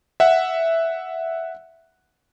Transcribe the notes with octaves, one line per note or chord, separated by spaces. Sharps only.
E5 F#5